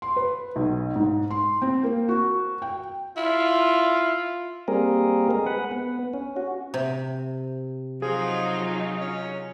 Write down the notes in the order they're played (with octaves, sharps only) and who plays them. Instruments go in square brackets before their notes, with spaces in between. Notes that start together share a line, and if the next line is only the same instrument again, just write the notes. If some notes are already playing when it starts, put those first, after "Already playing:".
[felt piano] C6
B4
B1
G#2
C6
C4
A#3
F#4
G5
[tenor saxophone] E4 [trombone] F4
[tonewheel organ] G3 A#3 C4 G#4 A#4
G#3 G#4
B4 F#5
B3
C#4
F#4
[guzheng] C3
[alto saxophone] F3 [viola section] F#3 D#4 F4 [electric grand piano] G#4
[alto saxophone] C#4